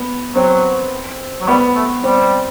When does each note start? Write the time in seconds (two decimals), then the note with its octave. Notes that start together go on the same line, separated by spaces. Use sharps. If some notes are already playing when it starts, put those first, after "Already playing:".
Already playing: B3
0.35 F#3 C4
1.41 F#3
1.48 G3 B3
1.76 A3
2.04 G3 C4